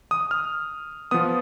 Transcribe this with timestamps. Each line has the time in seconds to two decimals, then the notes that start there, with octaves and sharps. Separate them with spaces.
0.11 D#6
0.31 F6
1.11 F3 B3 D#6